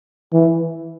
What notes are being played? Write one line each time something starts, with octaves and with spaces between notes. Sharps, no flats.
E3